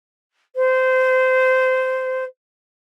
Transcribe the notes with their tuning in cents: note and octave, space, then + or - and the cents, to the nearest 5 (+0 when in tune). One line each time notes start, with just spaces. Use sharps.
C5 -20